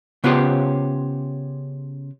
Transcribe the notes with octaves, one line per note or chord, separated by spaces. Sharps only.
C#3 B3 C#4 F4 G4 C5